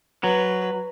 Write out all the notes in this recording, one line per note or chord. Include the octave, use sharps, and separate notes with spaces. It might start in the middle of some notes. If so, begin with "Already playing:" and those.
F#3 B4